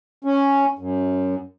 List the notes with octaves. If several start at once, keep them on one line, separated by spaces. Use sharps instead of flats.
C#4
F#2